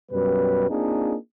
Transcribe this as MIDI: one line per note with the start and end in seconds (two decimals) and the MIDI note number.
0.12 0.65 42
0.12 0.65 47
0.12 0.65 55
0.12 0.65 71
0.70 1.16 58
0.70 1.16 60
0.70 1.16 62
0.70 1.16 63
0.70 1.16 65
0.70 1.16 68